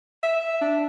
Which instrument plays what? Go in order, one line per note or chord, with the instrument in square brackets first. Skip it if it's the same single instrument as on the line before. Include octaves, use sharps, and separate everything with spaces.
[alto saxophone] E5
D4